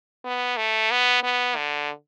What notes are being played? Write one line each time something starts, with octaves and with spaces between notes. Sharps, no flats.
B3
A3
B3
B3
D3